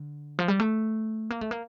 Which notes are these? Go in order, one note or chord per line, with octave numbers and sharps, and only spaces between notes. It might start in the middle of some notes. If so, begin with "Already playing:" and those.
Already playing: D3
F3
G3
A3
A#3
A3
A#3